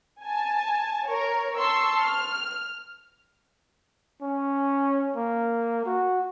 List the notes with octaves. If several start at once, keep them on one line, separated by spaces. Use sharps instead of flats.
G#5 A5
A#4 C#5
A5 C6 C#6 E6
F6
C#4
A#3
F#4